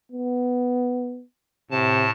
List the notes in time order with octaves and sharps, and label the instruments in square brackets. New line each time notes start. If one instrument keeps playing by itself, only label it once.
[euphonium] B3
[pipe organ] A2 A5 [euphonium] C3